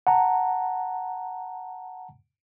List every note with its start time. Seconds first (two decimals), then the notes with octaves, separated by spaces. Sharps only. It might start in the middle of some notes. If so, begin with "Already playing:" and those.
0.07 F#5 A5 A#5